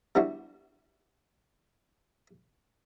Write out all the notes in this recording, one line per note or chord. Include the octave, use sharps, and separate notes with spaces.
G3 B3 D4 E4 F#4